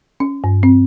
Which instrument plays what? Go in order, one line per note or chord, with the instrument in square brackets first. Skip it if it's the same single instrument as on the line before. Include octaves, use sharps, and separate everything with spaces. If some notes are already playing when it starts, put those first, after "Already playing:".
[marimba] C#4
G2
C4